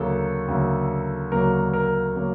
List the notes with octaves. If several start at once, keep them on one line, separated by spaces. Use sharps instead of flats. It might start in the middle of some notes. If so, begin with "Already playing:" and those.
Already playing: D2 C#3 F#3 A#3 A4
D2 C#3 F#3 A#3
D2 C#3 F#3 A#3 A#4
A#4
C#3 F#3 A#3